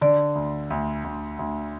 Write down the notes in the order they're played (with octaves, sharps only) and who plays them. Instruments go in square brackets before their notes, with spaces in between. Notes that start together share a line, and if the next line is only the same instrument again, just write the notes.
[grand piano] D3 [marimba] D5
[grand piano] D2
D2
D2
D2